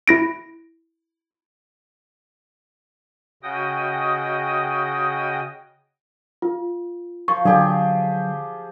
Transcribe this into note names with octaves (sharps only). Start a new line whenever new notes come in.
E4 A#6 D7
C#3 F#4 D#5 G5 D#6
F4
F3 C#6
D3 F3 F#3 G4 G#4